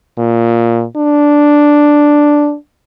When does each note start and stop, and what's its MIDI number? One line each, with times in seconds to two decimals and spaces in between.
0.18 0.85 46
0.96 2.55 62